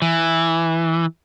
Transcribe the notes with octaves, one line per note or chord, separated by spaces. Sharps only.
E3